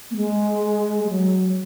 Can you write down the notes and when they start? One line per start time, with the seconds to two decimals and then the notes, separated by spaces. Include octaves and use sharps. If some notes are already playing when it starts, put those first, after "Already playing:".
0.11 A#3
0.16 G#3
1.04 G#3
1.09 F#3